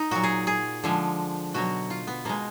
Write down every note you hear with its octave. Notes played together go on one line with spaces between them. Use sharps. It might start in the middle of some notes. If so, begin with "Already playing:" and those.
Already playing: D#4
A#2 F#3 F#4
G#4
G#4
D3 F3 G#3
B2 F#3 F#4
F4
B3
B2 G#3 A#3